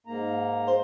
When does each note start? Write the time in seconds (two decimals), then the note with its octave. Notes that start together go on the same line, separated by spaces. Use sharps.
0.06 G#2 A#3 A#5
0.67 C5